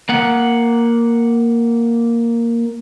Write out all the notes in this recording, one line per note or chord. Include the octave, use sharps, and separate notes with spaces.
A#3 F#5